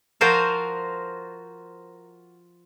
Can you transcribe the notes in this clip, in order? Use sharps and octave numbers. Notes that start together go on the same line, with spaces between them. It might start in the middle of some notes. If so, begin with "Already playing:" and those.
F3 F4 F#4 A#4 C5 F5